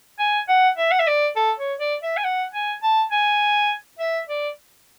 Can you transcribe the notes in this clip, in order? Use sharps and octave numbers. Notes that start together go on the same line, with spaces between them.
G#5
F#5
E5
F#5
E5
D5
A4
C#5
D5
E5
G#5
F#5
G#5
A5
G#5
E5
D5